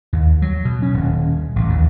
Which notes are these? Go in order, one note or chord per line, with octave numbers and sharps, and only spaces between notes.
D#2
F#3
B2
C#4
D#1
A1
D#2